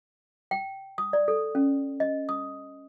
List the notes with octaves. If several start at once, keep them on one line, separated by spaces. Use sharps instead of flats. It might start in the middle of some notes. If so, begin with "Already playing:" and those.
G5
D#6
D5
A4
C#4
D#5
D#6